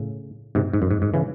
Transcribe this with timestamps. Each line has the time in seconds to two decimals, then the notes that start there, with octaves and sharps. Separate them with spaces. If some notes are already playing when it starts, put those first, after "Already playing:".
Already playing: A2 C#3
0.55 G#2 C3
0.73 G#2
0.82 F#2
0.91 G#2
1.02 G#2
1.14 C#3 E3